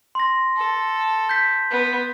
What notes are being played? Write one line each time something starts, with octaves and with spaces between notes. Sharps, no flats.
C6 A#6
A4
G6 B6
B3